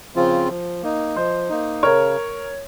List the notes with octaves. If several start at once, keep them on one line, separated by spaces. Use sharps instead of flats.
C#3 F3 C4 F4
F3
A#3 D#4
F3 C5 D#5
A#3 D#4
C#3 A#4 C#5